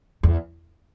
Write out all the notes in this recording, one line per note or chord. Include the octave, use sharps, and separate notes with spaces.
E2